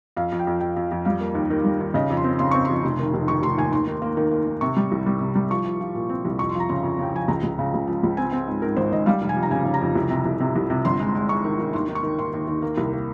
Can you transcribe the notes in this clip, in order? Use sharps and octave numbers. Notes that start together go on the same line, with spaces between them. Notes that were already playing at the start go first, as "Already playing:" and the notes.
F2 F5
F2
G5
F2
F2 G5
F2
F2
G3 F5
A#3
D#2
D#3
G3
D#2
C#3 D#5
F2
C6
C4
C#3 C6
C4 C#6
F2 C6
F1
D#3
F1
D#3 C#6
F1 C6
D#2 G#5
D#2 C6
D#3
A#3
D#3
A#3
D#3
C3 C#6
G3
C2
G3
C3
G3
F3 C#6
F3
F3
A#2
C4
C2
F2 C#6
C6
F3 A#5
C#3 C6
F2
C#3 G5
F3 G#5
C#2 A#5
C#2
C#3
C#2
F3
C#2
C4 G#5
C4
G#2
G#2 A#4
G#1 C5
G#1 D#5
G3 F5
F1
G#5
F2
A#5
C#3 G#5
C#3
A#5
F2
C2
C3
C2
C3
C2
C3
G1 C6
G#3
G#3
G#3 C#6
D#3
D#3
D#2 C6
D#3
C#6
D#3
D#2 C6
D#2
D#2
A#3
C2
A#3